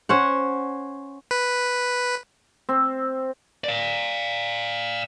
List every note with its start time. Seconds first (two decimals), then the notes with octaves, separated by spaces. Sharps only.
0.09 C#4 C5 F#5
1.31 B4
2.69 C4
3.64 D5 F5